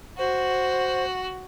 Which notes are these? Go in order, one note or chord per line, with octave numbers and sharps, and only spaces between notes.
F#4 C5